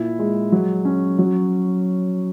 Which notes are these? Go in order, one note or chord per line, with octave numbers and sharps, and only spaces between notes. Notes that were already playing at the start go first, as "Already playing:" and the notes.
Already playing: A#2 E4
G#3
F#3
C#4
F#3